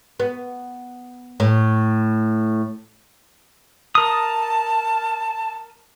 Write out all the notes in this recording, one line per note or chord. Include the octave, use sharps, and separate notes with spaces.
B3
A2
A#4 A5 D#6